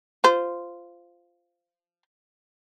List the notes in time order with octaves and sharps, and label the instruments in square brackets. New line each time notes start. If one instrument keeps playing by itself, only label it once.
[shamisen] F4 C5